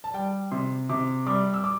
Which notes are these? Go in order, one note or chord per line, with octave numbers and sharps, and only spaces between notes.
A5
G3 G5
C3 C6
C3 D6
G3 D6
E6
D6